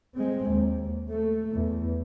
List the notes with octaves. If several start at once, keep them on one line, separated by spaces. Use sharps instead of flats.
G#3 C4
D#2
A3
E2